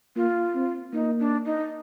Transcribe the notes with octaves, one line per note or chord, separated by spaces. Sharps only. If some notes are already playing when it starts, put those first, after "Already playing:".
A#3 F4
C4
A#3 D#4
D4
D#4